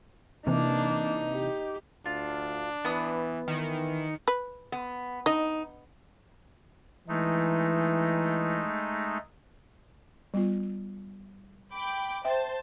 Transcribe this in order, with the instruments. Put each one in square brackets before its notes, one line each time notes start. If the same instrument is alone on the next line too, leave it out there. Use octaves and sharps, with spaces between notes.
[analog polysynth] C3 E3 [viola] A#3 D4 [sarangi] D#4
[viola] G4
[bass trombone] D2 [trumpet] D4 [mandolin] F4
[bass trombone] E3 [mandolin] B3 D#6
[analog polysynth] D#3 C#7 [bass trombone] E3
[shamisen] B4
[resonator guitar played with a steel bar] B3
[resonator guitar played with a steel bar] D#4 [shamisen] D#5
[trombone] E3 [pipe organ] G#3 A3 D#4
[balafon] G3 B3 F4
[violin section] G5 B5 D6
[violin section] C5 A5 [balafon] E5 G5